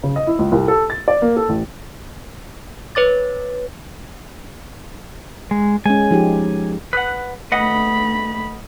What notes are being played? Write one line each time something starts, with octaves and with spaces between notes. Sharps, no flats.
C#3
D#5
E4
C#2
C2
A4
A6
D5
A#3
A4
A1
B4 C#5 D6 A6
G#3
G#3 C#4 G#5
F3 D#4 G4
B4 F#5
A3 B4 D#5 F#5 B5